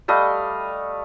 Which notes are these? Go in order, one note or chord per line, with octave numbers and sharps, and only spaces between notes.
G3 A3 D#5 F5